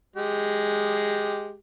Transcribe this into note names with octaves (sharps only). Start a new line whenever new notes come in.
G#3 G4